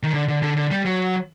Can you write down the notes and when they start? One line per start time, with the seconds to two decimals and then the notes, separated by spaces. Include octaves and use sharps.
0.03 D#3
0.14 D3
0.28 D3
0.42 D3
0.57 D3
0.71 G3
0.85 F#3